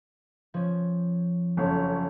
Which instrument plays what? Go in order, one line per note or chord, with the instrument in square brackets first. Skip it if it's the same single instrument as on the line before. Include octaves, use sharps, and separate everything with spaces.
[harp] F3 C#4
[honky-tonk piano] F#1 F2 C#5